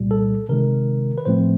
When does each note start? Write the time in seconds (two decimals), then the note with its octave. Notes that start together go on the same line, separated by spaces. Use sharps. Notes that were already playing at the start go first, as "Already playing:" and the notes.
Already playing: C2 A#2 G3
0.11 A4
0.49 C3 D#3 G#3 A#4
1.18 B4
1.25 A2 F3 A3 C4 C5